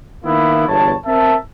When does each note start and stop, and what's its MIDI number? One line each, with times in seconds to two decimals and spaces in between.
0.24 0.64 51
0.24 0.64 58
0.24 0.64 59
0.24 0.64 64
0.67 0.93 31
0.67 0.93 40
0.67 0.93 73
0.67 0.93 81
1.06 1.34 60
1.06 1.34 70
1.06 1.34 76
1.06 1.34 81